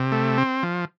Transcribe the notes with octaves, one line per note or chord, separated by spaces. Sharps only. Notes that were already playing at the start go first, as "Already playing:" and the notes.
Already playing: C3
A3
C4
F3